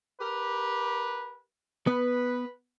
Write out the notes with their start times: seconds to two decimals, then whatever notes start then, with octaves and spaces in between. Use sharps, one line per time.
0.20 G4 A#4 B4
1.87 B3 B4